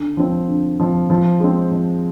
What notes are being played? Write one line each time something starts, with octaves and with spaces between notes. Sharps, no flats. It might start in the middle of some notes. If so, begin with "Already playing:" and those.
Already playing: D3
F3 C4
D3
F3 C4
F3
G#3 C4
F3